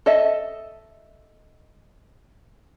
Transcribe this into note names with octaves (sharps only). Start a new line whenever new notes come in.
A4 D#5 E5